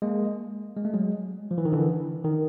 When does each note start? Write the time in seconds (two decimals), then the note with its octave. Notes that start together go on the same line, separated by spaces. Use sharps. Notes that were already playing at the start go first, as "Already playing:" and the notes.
0.02 G#3 A#3
0.77 G#3
0.85 A3
0.94 F#3 G#3
1.51 F3
1.58 E3
1.65 D#3
1.72 D3 E3
2.24 D#3